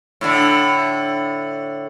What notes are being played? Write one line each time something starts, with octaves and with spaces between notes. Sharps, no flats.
A2 D3